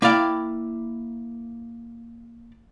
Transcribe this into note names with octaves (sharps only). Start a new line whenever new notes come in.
A#3 E4 D5 F5 G5